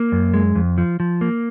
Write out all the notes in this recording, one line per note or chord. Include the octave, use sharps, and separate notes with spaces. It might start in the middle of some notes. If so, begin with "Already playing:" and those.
Already playing: A#3
F#2
G#3
F2
F3
F3
A#3